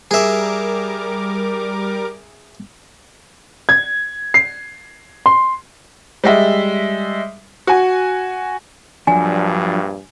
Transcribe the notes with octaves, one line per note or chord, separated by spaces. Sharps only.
G3 G#4 A#4 E5 D6
G#6
C7
C6
G3 G#3 E5
F#4 G#5
A#1 G2 F3 F#3 D4 G#5